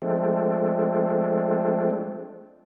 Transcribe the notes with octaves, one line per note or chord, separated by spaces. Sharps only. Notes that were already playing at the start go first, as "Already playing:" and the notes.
F3 G#3 A3 C4 D4